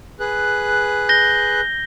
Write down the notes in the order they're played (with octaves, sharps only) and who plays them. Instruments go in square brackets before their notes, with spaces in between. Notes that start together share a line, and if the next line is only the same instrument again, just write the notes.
[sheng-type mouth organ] G#4 B4 F#6
[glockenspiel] G6 A#6 G7